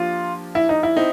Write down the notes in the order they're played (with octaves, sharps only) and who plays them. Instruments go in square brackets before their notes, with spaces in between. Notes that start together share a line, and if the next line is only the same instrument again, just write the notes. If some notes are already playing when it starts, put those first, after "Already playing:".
Already playing: [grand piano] F3 A#3 D4 G4 [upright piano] F4
[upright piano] E4
D#4
E4
[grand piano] C4 D#4